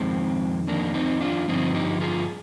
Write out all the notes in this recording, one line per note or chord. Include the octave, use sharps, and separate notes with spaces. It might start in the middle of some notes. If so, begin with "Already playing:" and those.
Already playing: F2 D#3 G#3 C4
F2 D#3 A#3 D4
C4 D#4
D4 F4
G2 D3 F3 C4 D#4
D#4 G4
F4 G#4